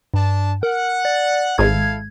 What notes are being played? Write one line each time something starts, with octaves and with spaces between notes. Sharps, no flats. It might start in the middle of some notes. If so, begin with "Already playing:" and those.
G2 D4 A5
A#4 F#5
D5
G#1 G#2 E4 A4 F5 G#6